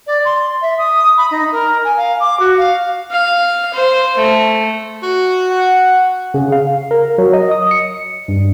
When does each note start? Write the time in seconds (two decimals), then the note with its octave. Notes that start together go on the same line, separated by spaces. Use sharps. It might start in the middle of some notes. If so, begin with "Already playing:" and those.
0.07 D5
0.25 C6
0.62 E5
0.78 D#6
1.17 B5
1.31 D#4
1.52 A#4
1.84 G#5
1.97 F5
2.20 D6
2.39 F#4
2.57 F5
3.11 F5
3.73 C5
4.17 A3
5.03 F#4
5.50 F#5
6.34 C#3
6.52 F5
6.91 A#4
7.18 F#3
7.33 D#5
7.51 D#6
7.71 C#7
8.28 G2